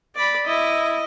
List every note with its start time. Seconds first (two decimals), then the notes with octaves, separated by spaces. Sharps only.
0.16 D5 B5
0.47 E4 D#5